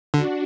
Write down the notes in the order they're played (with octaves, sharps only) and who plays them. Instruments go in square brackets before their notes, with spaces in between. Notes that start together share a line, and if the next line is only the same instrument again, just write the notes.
[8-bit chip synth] D3 [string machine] D4 F#4